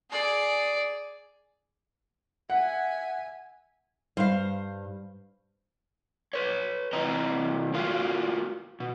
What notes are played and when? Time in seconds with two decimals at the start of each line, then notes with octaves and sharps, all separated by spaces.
0.11 G#4 D5
2.50 E5 F#5 G#5
4.17 G2 C5 F5
6.33 B4 C#5
6.93 C3 E3 C4 D#5 A#5
7.74 A3 F4 F#4 A4 A#4 F5
8.80 B2